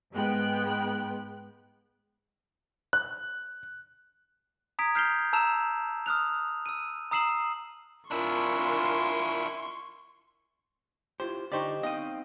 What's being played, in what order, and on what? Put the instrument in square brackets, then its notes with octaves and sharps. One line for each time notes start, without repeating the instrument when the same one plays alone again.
[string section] G#2 G#3 B3 G5 F#6
[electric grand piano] F#6
[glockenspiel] A#5 D#6 G#6 B6 D7
A#5 F6 G6 C7 F7 G7
A5 A#5 E6 E7 F7
D#6 F6 F#6 F7
E6 D#7
A#5 D#6 E6 C7 E7 F#7
[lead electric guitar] D4 E4 [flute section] F4 A#4 G#5 [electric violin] C6 C#6
[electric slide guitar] E4 F4 G4 [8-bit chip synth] C5
[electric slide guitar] D3 G4 [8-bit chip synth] D#4 C5 D5 [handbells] D#5 G5 C#6
[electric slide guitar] B3 C4 D#4 [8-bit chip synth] D#5 D#6 [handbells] F5 G5